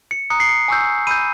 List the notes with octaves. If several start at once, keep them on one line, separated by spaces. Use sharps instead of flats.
C#7
A#5 D#6 F#6 C#7
C7
C#7
G#5 C#6 E6 G6
B5 E6 G6 D#7